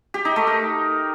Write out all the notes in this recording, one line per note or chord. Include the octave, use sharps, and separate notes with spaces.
G4
D#4
A3
A#4